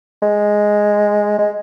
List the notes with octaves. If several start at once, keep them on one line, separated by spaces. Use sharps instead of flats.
G#3
G#3